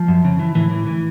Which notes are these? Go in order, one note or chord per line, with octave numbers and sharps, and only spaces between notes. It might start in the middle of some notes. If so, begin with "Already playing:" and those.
Already playing: F3
F#2
C#3
E3
A2 E3
E3
E3